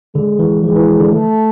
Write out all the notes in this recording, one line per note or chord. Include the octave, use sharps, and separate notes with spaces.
D3 G#3
E3
F3 G#3
E3
D3
A3